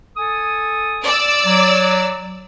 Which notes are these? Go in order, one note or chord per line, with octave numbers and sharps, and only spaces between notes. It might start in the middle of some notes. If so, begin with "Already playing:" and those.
A4 G#5 D#6
D5 E6
F#3